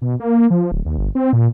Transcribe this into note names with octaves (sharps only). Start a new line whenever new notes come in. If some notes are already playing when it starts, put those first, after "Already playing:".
B2
A#3
F3
D1
D#2
G1
C4
A#2